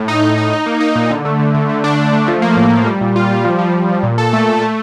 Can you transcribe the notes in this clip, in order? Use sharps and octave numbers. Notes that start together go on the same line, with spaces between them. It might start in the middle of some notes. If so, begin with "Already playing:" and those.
Already playing: A2
D#4
D#4
D#4
D#4
A#3
D#4
A#2
D3
A3
D3
D3
A3
D4
D4
A3
F3
A#3
A2
F3
G3
A#2
F4
G3
F3
F3
F3
F3
A#2
A4
A3
A3
A3